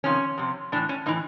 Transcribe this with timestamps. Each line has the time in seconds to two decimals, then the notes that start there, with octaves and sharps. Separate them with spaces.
0.04 F2 C3 D#3 C#4
0.38 F2 C3
0.72 A2 E3 D4
0.89 C#4
1.06 A2 E3 D#4